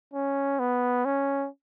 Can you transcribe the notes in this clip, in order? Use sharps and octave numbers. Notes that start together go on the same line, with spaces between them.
C#4
B3
C#4